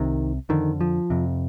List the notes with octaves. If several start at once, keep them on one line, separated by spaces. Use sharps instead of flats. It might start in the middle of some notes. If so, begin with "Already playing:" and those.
Already playing: C2 C3 D#3
F2 D3 D#3
F3
F2 C3